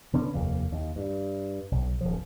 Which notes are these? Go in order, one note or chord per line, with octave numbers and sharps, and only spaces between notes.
D3 B3 C#4
F1 D#2 A#3
D#2
G2
B1
D1 F3